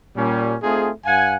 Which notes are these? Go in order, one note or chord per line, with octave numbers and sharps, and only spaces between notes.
A#2 G3 C#4
A3 C4 D#4 F4 G#4
G2 F5 F#5 G#5